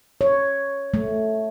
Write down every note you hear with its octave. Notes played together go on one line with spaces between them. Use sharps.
C#5
A3